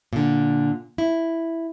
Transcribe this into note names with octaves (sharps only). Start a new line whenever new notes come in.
A#2 D3
E4